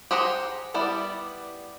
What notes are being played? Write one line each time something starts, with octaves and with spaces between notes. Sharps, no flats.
G4 G#4 C5 F#5 A#5
G3 B3 E4 D5